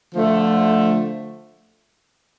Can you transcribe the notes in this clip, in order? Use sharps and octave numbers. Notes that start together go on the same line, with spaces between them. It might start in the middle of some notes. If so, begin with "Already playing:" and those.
D3 F3 A3